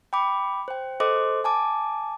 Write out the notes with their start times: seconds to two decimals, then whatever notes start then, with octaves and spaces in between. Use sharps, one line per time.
0.13 G5 B5 D6
0.68 C5 G5
1.00 A4 C5 D#5 C6 D6
1.44 G#5 A5 D6